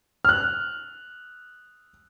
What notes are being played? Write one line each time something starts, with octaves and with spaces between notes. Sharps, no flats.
F6 F#6